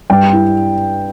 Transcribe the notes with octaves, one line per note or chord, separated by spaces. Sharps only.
G2 G5
E4